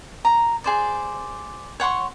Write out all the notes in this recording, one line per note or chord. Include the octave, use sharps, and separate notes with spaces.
A#5
G#4 C5 D5
C#5 F#5 C6 C#6